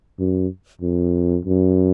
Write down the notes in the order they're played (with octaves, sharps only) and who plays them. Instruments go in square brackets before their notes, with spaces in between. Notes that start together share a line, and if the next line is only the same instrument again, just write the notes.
[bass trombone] F#2
F2
F#2